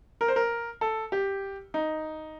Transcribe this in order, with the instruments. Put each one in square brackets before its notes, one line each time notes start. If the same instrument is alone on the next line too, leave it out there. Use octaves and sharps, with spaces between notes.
[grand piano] A#4
C5
A#4
A4
G4
D#4